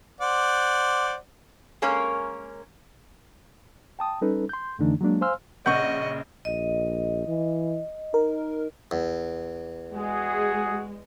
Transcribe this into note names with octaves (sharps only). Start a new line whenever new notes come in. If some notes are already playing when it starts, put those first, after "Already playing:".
C5 D5 F#5
G#3 A#3 C#4 A#4 C#5
G5 A5 D#6
G3 C#4 D#4 A4 B4
C6 G6
F2 D3 E3 A3 D4 D#4
F#3 G#3 A#3 D4
C5 F5 G#5 C6 E6 F6
A#1 C#3 D#5 F#5 C#6 G6
A#1 D#5
E3
D#4 A#4
E2
G#3 F#4 G#4